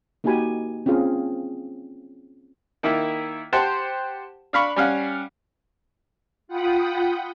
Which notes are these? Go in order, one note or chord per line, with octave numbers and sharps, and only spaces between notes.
A#3 D#4 F#4 G4 G#5 B5
C4 C#4 F4 G#4 F5
D#3 A#3 E4
G4 C5 F#5 A5
D4 F5 B5 C#6
G3 C#4 F5 F#5
F4 F#5 G5 B5 D#6